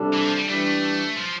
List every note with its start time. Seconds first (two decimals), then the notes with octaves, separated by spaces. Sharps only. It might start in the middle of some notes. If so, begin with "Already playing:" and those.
Already playing: C3 G3 D4 A4
0.13 E3
0.25 F3
0.36 G3
0.48 E3 G3 A3 D4
1.16 F3